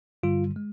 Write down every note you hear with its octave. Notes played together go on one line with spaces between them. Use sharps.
G2 D3 G3 F4
G#3